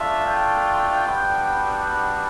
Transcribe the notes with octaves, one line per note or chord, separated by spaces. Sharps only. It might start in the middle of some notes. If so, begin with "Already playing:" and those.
Already playing: A3 D4 F4 E5
G5
G3 B3 D4 F#4